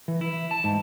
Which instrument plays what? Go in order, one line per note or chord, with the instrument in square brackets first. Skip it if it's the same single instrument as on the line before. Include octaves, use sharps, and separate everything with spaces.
[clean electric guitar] E3
E4
A5
G#2